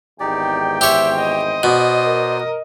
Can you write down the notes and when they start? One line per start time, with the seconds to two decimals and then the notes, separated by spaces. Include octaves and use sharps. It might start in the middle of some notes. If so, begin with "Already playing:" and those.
0.20 G#1 E2 D#4 G4 D5 G5
0.81 G4 C5 C#5 E5
1.19 D#5
1.63 B2 C5 D5
2.05 A#4